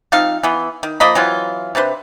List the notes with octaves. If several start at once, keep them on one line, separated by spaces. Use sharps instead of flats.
F3 C4 D#4 F5
E3 B3
D#3
F3 A#3 D#5 B5
E3 F#3 C4 F4
C3 D4 B4 C5